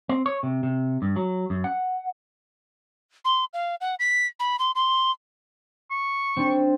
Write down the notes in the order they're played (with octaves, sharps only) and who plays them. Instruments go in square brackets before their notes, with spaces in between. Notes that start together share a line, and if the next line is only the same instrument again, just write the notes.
[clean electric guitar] C4
C#5
C3
C3
G2
F#3
F#2
F#5
[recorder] C6
F5
F#5
B6
B5
C6
C6
[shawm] C#6
[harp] C4 D4